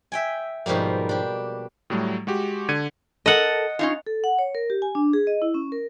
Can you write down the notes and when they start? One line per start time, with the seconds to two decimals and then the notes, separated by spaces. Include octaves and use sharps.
0.12 E5 G5 G#5
0.66 G#2 B2 F3 G3 A#3
1.09 D4 G4
1.90 A2 F#3 G3 A3
2.27 G#3 F#4 G4
2.69 D3 G#6 C#7 D#7
3.26 A4 A#4 D#5 F#5
3.79 C#4 D#4 F4
4.07 A4
4.24 F#5
4.39 C#5
4.55 A#4
4.70 G4
4.82 G#5
4.95 D4
5.13 G#4
5.27 D#5
5.42 E4
5.54 C#4
5.72 A#4